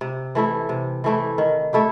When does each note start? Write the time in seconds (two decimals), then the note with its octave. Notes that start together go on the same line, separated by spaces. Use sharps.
0.01 C3
0.35 E3 A3 E4
0.69 C3
1.04 E3 A3 E4
1.38 D#3
1.73 A3 E4 G4